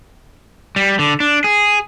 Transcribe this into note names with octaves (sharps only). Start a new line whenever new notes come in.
G3
D3
D4
G#4